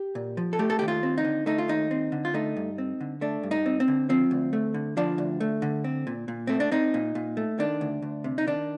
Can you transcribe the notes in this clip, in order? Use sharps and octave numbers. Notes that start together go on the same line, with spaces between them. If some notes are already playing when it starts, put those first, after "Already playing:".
Already playing: G4
A#2
F3
A4
A3 G4
A4
D#2 G4
F4
C4
D#4
D3
A3 D#4
F4
D#2 D#4
C4
D3
F4
A3 D#4
G2
C4
D3
A3 D4
G2
D#4
C4
C4
D3
F3 C4
D2
A3
D3
F3 D4
D2
A3
D3
C4
A#2
A#2
A3 C4
D4
C4 D#4
A#2
A#2
A3
D#3 D4
D2
D2
C3
D#4
D#3 D4